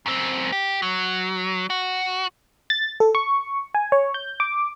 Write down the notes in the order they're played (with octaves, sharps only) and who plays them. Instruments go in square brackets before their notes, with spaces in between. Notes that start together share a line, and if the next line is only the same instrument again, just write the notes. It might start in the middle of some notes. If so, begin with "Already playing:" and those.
[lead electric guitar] F#2 C4
G4
F#3
F#4
[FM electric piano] A6
A4
C#6
G#5
C#5
G6
D6